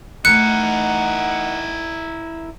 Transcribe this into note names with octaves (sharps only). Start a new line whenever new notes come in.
E3 A3 D#4 E4 A#4 F#5 F#6 C#7